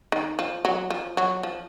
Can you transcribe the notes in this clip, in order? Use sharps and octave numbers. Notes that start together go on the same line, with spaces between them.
D#3
F3
F#3
F3
F#3
F3